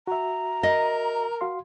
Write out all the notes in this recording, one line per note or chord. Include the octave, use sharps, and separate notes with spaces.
F#4 E5 A#5
A#4 D#5
F#4 F5 C6